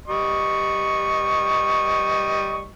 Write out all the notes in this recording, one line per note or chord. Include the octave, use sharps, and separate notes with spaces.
G3 D#5 C#6